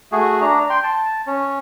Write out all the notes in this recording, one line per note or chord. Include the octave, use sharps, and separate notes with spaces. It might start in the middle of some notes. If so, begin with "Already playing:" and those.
A3 F#4 G#4
D4 A#5
G5 C6
A5
C#4